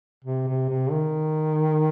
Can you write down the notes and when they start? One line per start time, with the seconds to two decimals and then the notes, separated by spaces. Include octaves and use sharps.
0.25 C3
0.48 C3
0.69 C3
0.91 D#3